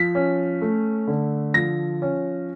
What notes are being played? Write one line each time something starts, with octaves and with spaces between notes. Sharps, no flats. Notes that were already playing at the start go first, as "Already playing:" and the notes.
Already playing: F3 B6
C#4
A3
D3
F3 A#6
C#4